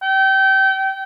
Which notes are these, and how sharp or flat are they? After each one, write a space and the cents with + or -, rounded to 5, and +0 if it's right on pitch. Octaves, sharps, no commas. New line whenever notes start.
G5 -30